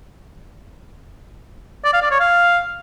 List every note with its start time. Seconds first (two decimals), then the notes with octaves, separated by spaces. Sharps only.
1.84 D5
1.93 F5
2.02 D5
2.11 C#5
2.20 F5